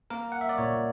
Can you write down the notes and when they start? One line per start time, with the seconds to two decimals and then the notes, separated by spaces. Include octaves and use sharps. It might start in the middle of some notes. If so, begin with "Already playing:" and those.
0.10 A#3 A#4
0.32 F#5
0.41 E5
0.49 D5
0.58 A#2 C#5